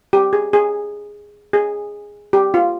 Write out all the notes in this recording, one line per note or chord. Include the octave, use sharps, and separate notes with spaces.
G4
G#4
G#4
G#4
G4
F4